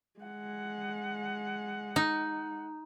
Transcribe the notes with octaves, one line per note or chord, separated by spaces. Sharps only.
G#3 F#5
D#4